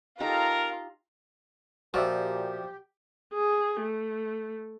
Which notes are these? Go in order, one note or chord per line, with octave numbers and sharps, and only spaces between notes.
D#4 F4 G4 A4 A#4 A#5
A#2 F3 F#4 G4 D5 E5
G#4
A3